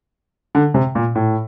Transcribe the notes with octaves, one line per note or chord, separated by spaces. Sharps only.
D3
C3
A#2
A2